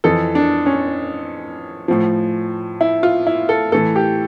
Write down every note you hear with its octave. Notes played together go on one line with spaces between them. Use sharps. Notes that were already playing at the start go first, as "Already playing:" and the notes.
F2 E3 A4
D4
C#4
A2 F3
E4
F4
E4
A4
A2 E3 A4
G4